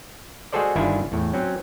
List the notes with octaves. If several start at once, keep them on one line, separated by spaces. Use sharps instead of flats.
G#3 F#4 G#4 A4 C5 D5
G1 D#3 D4 E4 F4 G#5
E2 A2
F#3 C4 C#4